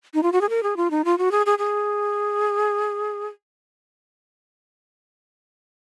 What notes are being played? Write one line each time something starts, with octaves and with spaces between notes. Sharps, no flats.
D#4
F4
F#4
G#4
A#4
G#4
F4
D#4
F4
F#4
G#4
G#4
G#4